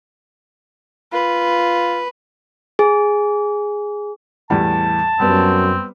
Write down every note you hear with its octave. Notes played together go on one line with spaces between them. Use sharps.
F4 B4
G#4
E2 A2 G3 A5
F#2 G3 B3 C4